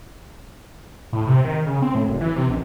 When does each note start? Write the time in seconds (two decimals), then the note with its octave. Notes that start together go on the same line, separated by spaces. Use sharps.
1.13 A2
1.27 C3
1.44 D#3
1.66 C#3
1.82 C4
1.95 A2
2.08 F#1
2.21 E3
2.36 C3
2.49 A#1